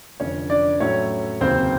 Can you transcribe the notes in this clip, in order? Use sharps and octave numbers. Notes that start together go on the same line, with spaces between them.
F1 F2 D3 C#4 C#5
D4 D5
A2 F#3 A3 C#4 C#5
F1 D#2 C#3 F#3 C4 C5